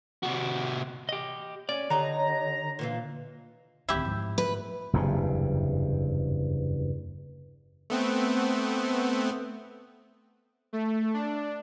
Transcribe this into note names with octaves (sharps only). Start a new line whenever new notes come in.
C3 F#4
G4 D#5
C#4 C#5 D5
D3 D#4 G4 A#5
A#2 E3 F4
D1 D#3 E4 G4
G#2 F3
B4
F#1 E2 G2 C3
A3 B3 C4
A3
D4